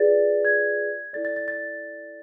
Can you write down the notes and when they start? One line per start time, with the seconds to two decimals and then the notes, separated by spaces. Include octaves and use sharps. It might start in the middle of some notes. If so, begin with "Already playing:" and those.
Already playing: F4 G#4 B4 D5 A6
0.45 G#6
1.13 E4 A4 D5 A6
1.25 A6
1.36 A6
1.48 A6